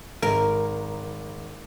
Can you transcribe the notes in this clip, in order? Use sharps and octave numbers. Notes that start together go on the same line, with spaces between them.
G#1 A#4